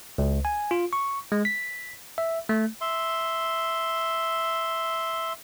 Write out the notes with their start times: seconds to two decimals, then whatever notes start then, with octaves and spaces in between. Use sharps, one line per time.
0.18 C#2
0.45 G#5
0.71 F4
0.93 C#6
1.32 G#3
1.45 B6
2.18 E5
2.49 A3
2.81 E5 C6